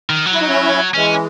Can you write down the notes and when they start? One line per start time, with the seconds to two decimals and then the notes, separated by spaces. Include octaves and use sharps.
0.10 D#3
0.26 F#3
0.33 E4
0.41 D#4
0.48 C#4 E4
0.94 E3 G#3 C#4